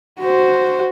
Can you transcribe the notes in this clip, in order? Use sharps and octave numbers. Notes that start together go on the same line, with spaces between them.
F#4 C5